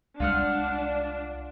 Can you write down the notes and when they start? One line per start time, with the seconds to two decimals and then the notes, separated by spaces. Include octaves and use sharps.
0.20 C2 G3 G#3 D4 F4 F#5 F6